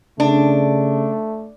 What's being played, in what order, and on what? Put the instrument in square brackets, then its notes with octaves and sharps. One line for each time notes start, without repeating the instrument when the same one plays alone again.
[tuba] C#3 [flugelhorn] A3 [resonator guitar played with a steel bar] D4